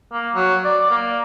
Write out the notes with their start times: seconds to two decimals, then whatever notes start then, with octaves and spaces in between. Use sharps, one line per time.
0.13 A#3
0.35 F#3
0.65 D5
0.90 A#3